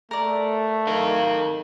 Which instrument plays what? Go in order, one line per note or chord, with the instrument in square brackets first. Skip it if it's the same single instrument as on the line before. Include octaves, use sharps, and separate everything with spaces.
[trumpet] A3 [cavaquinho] A#4 D5
[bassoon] D#3 [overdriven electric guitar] A4 F5